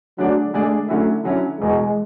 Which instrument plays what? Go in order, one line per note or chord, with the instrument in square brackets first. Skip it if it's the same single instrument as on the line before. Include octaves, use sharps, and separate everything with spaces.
[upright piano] D3 A3 D4 G#4 D5 [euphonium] F#3
[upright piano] D3 A3 D4 G#4 D5 [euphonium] G#3
[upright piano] D3 F#3 C#4 E4 [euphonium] A3
[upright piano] D3 F#3 C#4 E4
[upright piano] E1 E2 B2 [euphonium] G#3